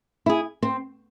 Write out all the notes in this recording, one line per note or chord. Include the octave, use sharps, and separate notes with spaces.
E4 G#4
C4